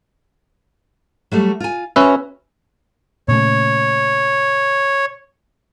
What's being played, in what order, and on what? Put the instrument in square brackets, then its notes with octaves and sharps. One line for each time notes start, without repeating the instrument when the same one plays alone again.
[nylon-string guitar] F#3 G3 A3
F4 G#5
[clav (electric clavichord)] C#4 B4 E5 [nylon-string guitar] F#4 C#5
[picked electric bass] A#2 C#3 A3 [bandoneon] C#5